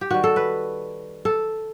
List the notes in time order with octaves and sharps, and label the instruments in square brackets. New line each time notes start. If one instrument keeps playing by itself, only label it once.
[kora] G4
D#3 G3 F#4
A4
B4
A4